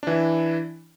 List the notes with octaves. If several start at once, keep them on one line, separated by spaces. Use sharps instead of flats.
E3 D4 E4